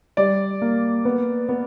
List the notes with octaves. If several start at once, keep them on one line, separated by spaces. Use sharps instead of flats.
G3 D5
A#3
B3
B3